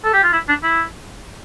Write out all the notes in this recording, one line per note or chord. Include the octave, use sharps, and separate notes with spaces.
A4
G4
F4
E4
D4
E4